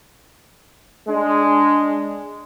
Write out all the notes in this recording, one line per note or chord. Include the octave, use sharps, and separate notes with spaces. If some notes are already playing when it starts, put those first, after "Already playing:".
G#3 D4